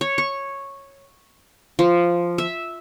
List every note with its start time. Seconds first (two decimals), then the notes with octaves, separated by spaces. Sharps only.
0.01 C#5
0.18 C#6
1.79 F3
2.38 E5